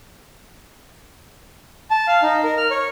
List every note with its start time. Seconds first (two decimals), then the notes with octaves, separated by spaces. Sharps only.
1.90 A5
2.07 F5
2.22 D#4
2.44 A#4
2.57 F6
2.71 C#5